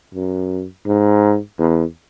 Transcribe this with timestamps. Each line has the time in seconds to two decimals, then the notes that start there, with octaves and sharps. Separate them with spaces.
0.15 F#2
0.87 G#2
1.59 E2